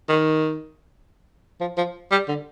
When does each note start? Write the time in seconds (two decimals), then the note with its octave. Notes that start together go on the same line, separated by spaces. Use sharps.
0.09 D#3
1.61 F3
1.77 F3
2.11 G3
2.28 D3